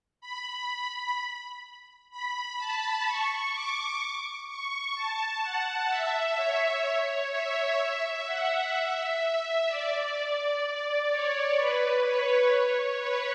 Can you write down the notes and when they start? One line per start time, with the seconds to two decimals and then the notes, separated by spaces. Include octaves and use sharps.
0.21 B5
2.11 B5
2.58 A5
3.06 C#6
3.53 D6
4.48 C#6
4.96 A5
5.43 F#5
5.90 E5
6.37 C#5
7.32 E5
8.26 F#5
8.74 E5
9.69 D5
11.10 C#5
11.58 B4
12.05 C#5
13.00 B4